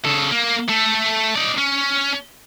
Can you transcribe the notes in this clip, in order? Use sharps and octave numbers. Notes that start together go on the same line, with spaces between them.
C#3 A4
A#3
A3 A4
D#4 D5
C#4